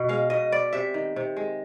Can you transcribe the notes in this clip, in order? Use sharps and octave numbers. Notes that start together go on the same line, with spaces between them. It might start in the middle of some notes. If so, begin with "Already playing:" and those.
Already playing: B2
G#3 F5
B2 D#5
B3 D5
C3 E5
D#3
C3
G#3